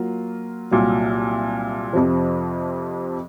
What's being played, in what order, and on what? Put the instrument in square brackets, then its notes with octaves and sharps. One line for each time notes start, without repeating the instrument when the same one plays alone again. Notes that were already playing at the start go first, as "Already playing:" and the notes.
Already playing: [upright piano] F#3 A#3 F4
C2 A#2 F#3
F2 C3 F3